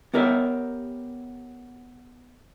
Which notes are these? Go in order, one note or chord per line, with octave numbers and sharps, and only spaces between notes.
B3 G4 A#4 C#5 E5